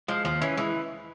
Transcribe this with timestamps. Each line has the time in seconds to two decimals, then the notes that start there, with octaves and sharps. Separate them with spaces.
0.08 F3 G#3
0.24 D#2 F3
0.41 E3 C#4
0.57 E3 G#3